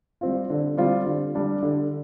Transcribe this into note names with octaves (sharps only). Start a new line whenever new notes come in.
G3 C4 F4
D3
G3 C4 F4
D3
G3 D4
D3